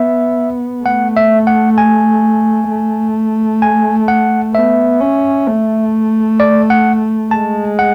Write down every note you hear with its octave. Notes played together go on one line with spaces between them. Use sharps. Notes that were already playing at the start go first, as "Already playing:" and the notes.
Already playing: B3 E5
A3 F#5
E5
F#5
G#5
A3
G#5
F#5
B3 E5
C#4
A3
D5
F#5
G#3 A5
F#5